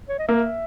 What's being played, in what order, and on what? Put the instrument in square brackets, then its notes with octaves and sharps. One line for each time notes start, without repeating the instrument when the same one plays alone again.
[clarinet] C#5
D#5
[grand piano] A#3 [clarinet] E5